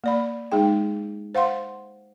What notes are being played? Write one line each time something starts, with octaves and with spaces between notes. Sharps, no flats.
A#3 D5 B5
G#3 D#4 G#4 G5
C5 F5 F#5 C6